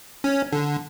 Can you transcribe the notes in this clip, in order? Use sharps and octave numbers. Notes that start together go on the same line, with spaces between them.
C#4
D3